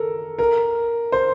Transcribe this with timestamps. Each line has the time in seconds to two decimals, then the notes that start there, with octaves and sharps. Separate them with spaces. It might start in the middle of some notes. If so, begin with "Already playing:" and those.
Already playing: A4 A#4
0.39 A#4
1.12 C5